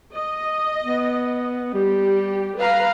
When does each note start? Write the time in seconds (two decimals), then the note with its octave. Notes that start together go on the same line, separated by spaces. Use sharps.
0.13 D#5
0.83 B3
1.74 G3 G4
2.58 B4 F5 A#5